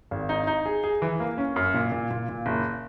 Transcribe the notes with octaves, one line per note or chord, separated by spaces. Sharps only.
G#1
D#4
D#4
G#4
G#4
E3
A#3
C#4
F#2
A#2
A#2
A#2
A#2
F#1